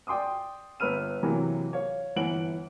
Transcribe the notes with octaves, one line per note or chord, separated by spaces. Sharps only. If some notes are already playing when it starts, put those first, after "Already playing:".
D5 G5 C6 D6 D#6
G1 B4 E6 F6 D#7
C3 E3 F#3 A#3
C#5 F5
G1 E3 F#5 D7 F#7